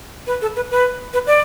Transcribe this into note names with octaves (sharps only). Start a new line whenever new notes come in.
B4
A4
B4
B4
B4
D5